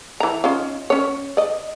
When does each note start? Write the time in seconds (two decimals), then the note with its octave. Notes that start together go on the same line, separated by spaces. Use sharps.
0.20 E3 A#5
0.44 C#4 D#4 F4
0.90 C#4 C#5
1.37 D5 D#5